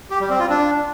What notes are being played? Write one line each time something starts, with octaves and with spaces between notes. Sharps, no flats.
G4
G3
C4
F4
D4